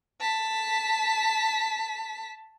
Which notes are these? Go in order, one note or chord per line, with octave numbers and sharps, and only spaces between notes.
A5 B6